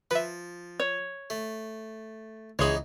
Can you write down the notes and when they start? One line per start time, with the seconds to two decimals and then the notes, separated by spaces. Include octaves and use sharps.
0.11 F3 B4 E5
0.80 C#5
1.30 A3
2.59 C#2 E3 D#4 G#4 C#5 C6 G#6